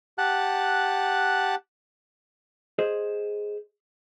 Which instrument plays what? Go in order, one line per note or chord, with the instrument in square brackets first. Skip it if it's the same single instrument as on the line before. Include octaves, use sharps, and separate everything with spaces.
[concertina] G4 F#5 A5 F#6
[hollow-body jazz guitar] G#4 C5 D#5